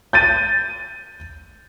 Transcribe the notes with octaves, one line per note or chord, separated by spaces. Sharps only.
G6 A6 D#7